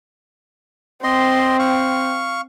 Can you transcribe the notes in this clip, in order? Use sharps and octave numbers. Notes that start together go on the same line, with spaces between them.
C4 D#5 C6
F5 C#6